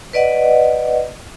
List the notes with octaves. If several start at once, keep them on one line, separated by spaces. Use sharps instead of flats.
B4 D5 D#5 F#5